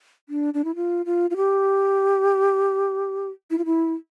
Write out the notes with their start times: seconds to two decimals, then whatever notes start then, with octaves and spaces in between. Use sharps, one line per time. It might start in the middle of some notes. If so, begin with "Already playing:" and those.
0.29 D4
0.54 D4
0.64 E4
0.75 F4
1.06 F4
1.30 F4
1.36 G4
3.51 E4
3.58 F4
3.65 E4